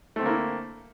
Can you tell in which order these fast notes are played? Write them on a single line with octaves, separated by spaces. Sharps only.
A3 C4 D3 A#3 E4